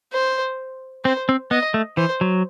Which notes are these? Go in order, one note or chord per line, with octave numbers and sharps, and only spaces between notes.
C5
C4 C5
C4
B3 D#5
A3
E3 C5
F#3